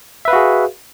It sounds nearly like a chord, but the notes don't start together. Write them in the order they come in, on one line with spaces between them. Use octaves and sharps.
E5 B4 F5 F#4 G#4